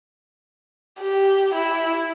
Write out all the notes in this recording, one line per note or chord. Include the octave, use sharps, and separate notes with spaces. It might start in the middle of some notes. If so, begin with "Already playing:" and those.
G4
E4